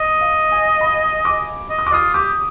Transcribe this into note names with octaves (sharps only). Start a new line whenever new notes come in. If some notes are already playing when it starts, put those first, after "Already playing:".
Already playing: D#5
F5
G#5
B5
D6
D#5
D#6
D6
F4 D#6
G4 D6